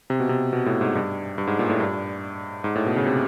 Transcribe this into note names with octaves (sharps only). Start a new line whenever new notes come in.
C3
B2
C3
B2
A2
G#2
G2
G2
G#2
A#2
A2
G2
G#2
A2
B2
C#3
C3